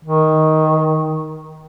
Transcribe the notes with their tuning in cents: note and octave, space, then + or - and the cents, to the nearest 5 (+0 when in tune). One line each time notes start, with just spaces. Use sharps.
D#3 +10